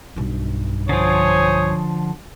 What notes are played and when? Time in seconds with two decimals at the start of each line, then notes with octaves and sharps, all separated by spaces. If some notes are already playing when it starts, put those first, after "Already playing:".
0.16 B1 G2
0.89 D3 F3 C5 C#5 G#5 D#6